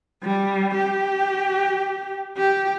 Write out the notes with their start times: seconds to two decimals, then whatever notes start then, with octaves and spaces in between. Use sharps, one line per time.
0.24 G3
0.75 G4
2.37 G4